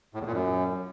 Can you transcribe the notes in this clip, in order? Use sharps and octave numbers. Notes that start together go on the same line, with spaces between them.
A2
E2
A#2
F#2